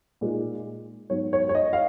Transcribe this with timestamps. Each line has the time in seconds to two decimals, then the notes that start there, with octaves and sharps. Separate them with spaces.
0.21 A#2 G#3 D#4
1.10 G#2 F#3 B3 C#5
1.33 C#5
1.49 C#5
1.55 D#5
1.73 F5